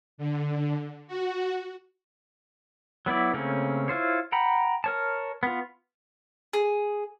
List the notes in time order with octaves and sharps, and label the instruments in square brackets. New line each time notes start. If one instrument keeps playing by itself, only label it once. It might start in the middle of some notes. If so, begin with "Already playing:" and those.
[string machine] D3
F#4
[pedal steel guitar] F#3 B3 E4 D5
C#3 A3 A#3 C4 C#4
E4 F4 C5 C#5
F#5 G5 A#5 B5
A#4 C#5 A5
B3 F4
[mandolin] G#4